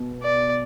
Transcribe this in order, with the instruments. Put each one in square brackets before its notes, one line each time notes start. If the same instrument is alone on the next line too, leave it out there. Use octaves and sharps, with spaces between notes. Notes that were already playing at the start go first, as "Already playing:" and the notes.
Already playing: [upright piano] B2 B3
[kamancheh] D5